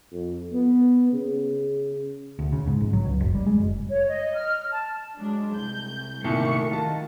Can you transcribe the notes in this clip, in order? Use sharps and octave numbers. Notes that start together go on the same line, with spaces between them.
F2
B3
C#3
D2
C#3
G#2
A#1
F#3
C#2
F#1
G3
G#3
F#1
C#5
D#5
F6
A5
F#3 G#3 D4
C2 G6
C2 A#2 D#3 A3 C#6 C#7
D#3 F4 A5